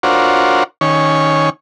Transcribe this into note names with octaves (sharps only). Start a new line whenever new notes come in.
D4 F4 F#4 A#4 C5 C#5
D#3 C#4 C#5 G#5